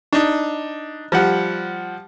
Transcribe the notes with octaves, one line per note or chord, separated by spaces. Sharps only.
D4 D#4
F3 G3 F#5